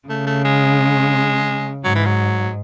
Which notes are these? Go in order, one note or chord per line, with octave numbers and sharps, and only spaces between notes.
C#3 A3
A3
G#3
G#2 F#3
E3
F#3